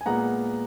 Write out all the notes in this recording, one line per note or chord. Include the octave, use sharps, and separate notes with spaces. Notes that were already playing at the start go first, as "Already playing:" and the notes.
G#5
A#2 G#3 B3 F#5 A#5